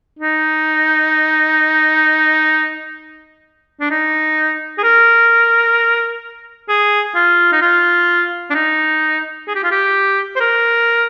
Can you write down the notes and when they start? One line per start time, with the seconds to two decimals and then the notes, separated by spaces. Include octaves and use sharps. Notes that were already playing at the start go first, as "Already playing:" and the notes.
0.19 D#4
3.81 D4
3.91 D#4
4.78 G#4
4.83 A#4
6.69 G#4
7.15 F4
7.52 D#4
7.62 F4
8.50 D4
8.54 D#4
9.47 G#4
9.55 G4
9.63 F4
9.71 G4
10.36 C5
10.40 A#4